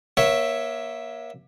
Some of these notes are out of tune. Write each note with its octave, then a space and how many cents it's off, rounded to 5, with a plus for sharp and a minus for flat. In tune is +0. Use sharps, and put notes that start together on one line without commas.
A#3 +35 C#5 +0 E5 +0